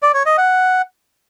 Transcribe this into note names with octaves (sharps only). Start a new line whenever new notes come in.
D5
C#5
D#5
F#5